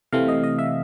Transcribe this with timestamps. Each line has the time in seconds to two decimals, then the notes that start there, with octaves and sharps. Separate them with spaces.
0.12 C3 E3 A3 C4 F5
0.28 D#5
0.43 D#5
0.59 E5